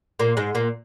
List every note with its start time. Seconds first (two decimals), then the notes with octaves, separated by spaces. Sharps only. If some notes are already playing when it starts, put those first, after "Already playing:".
0.19 A#2 A#3
0.37 G#2 G#3
0.55 A#2 A#3